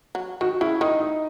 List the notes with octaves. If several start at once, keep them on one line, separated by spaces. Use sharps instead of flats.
F#3
D#3 F#4
C#3 E4
D#3 D#4
D#4